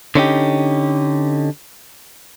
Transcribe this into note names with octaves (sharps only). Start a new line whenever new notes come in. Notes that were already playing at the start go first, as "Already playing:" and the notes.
D3 C#4 D#4 G4